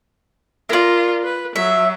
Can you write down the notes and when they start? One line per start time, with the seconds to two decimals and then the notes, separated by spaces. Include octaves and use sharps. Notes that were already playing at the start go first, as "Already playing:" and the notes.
0.69 F4 A#4 D5
1.24 B4
1.56 F#3 E5